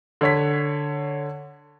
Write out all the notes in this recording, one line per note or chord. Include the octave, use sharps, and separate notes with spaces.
D3 C#5 B6